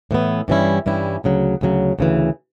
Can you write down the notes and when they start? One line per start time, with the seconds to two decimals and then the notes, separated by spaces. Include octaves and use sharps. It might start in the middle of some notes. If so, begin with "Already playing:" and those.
0.11 A2 E3 B3
0.48 G2 E3 G3 C#4 E4
0.86 G2 E3 G3 C#4 E4
1.24 D2 C#3 F#3
1.61 D2 C#3 F#3
1.99 D2 C#3 E3